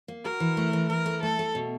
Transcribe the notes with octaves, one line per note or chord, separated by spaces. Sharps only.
A#3
F#4 A#4
E3
A3
E3
E3 A#4
A3
A3 A4
A3
B2